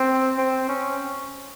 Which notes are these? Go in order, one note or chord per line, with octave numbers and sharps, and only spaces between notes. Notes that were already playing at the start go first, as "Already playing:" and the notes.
Already playing: C4
C4
C#4